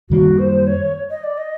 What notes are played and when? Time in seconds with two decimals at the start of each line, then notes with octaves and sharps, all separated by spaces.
0.10 F#2 D#3 G3 A#3 F#4
0.38 C5
0.66 C#5
1.10 D#5
1.24 D5
1.37 D#5